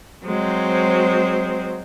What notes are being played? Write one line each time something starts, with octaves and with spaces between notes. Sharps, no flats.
F#3 G#3 C4 C5